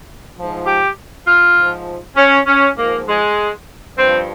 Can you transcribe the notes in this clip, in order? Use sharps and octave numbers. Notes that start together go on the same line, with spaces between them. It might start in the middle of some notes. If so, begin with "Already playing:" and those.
G#2 F3
G4
F4
G#2 F3
C#4
C#4
G#2 F3 A#3
G#3
G2 F3 C4